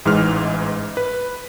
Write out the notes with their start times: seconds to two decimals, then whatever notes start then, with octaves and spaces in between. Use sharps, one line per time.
0.05 A1 G#2 E3 G#3 F6
0.97 B4